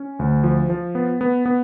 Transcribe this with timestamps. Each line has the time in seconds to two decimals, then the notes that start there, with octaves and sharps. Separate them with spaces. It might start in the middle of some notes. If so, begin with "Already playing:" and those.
Already playing: C#4
0.19 D2
0.44 F3
0.70 F3
0.95 B3
1.21 B3
1.46 B3